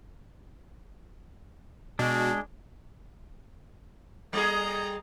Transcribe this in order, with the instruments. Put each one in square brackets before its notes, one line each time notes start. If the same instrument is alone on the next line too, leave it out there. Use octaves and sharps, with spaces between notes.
[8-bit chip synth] B2 [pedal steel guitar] G#3 D4
[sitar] G3 G#4 [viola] D#5 A#5